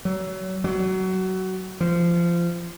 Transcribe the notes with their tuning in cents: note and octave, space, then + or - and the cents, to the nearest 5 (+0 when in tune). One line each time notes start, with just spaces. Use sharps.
F#3 +30
F#3 +20
F3 -25